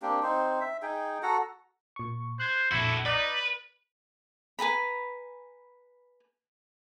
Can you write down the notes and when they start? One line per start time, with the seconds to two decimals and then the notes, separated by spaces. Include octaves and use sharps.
0.02 A#3 C4 D4 G4
0.23 C4 D#4 C5
0.61 E5
0.82 D#4 G#4 G5
1.23 F#4 A4 F#5 A#5
1.96 A#2 C#6
2.40 C5 F#6 G#6
2.71 A#1 F2 E4 F#4 A4
3.05 D#4 B4 D5 A6 B6
4.59 B4 G#5 A#5 B5